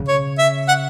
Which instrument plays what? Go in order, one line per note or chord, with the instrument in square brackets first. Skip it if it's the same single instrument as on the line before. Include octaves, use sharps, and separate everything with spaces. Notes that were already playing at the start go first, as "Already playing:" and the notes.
Already playing: [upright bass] C#3
[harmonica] C#5
E5
F#5